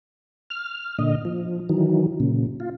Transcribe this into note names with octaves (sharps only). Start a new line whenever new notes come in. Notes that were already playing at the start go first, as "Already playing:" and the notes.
F6
A#2 D3 D#5
F3
D#3 E3 F#3
A#2 C#3
F4